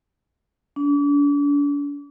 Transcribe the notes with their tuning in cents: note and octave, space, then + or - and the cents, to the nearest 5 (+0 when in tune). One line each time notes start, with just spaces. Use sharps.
D4 -40